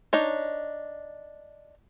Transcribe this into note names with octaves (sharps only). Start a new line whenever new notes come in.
D4 D#4 C#5